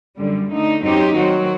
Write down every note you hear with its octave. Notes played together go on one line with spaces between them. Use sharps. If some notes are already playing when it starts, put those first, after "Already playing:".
F#2 D3 G3
D3 A3 D#4
F#2 F#3 C4 D#4 G4
D#3 F#3 C4 F#4